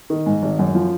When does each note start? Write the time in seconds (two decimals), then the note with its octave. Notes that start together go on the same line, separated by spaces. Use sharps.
0.10 D#3
0.26 G#2
0.43 G#1
0.59 F#2
0.75 F3